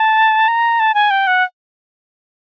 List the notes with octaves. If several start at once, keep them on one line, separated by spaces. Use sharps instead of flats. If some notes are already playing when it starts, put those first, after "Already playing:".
Already playing: A5
A#5
A5
G#5
G5
F#5